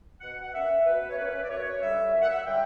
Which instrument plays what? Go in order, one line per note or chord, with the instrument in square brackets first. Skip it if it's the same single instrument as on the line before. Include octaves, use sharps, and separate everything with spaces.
[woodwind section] B2 F#5
F#5
A#3 C#4 E5
B2 B4
C#5
A#3 C#4 B4
E5
D5
F#2 C#5
D3 G3 E5
F#2 E5
F#5
E5
D3 G3 G5